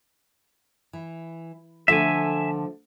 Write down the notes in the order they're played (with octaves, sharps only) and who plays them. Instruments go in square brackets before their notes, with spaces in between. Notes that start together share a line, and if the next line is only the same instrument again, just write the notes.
[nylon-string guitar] E3
[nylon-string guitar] D3 F3 A3 [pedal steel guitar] E5 G#5